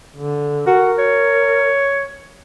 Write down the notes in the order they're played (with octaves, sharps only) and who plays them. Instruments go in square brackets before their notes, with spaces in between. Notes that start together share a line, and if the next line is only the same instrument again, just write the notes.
[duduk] D3
[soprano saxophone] F#4 [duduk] A#4
[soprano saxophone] C#5